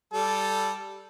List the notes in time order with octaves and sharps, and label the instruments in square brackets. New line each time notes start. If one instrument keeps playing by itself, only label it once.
[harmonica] G3 A4